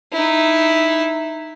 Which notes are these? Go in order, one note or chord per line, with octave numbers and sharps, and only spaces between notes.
D#4 E4